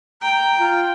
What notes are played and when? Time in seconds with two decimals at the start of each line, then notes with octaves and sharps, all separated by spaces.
0.21 G5 A#5
0.58 F4